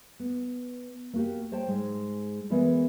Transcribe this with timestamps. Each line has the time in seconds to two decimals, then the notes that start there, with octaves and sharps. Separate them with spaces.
0.20 B3
1.13 A#3 F#4 G4
1.52 C5 C#5 G5 A5
1.68 G#2 G#3
2.50 E3 G#3 B3 E4 A#4 D5